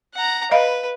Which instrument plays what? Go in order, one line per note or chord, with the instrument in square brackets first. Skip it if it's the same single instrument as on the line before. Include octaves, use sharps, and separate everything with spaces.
[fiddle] F#5 A#5
[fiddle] B4 [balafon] D#5 F5 B5